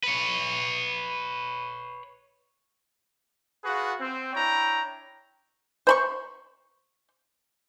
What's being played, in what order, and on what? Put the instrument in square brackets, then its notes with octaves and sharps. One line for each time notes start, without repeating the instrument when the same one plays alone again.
[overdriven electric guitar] B4 C#5
[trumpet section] F4 F#4 G#4 B4 F#5
C4
D4 E4 C#5 G5 A#5
[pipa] C5 B5 C#6